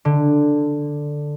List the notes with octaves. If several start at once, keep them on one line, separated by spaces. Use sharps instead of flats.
D3